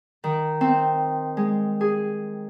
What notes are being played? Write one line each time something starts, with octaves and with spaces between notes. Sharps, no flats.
D#3
C4
G#3
G#4